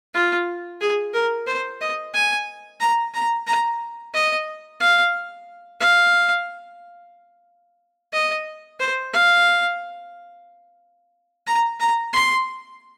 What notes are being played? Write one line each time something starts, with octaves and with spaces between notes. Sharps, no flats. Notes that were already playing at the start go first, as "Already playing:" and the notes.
F4
G#4
A#4
C5
D#5
G#5
A#5
A#5
A#5
D#5
F5
F5
D#5
C5
F5
A#5
A#5
C6